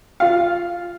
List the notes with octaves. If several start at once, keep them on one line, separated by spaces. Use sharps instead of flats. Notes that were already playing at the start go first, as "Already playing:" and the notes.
F4 F5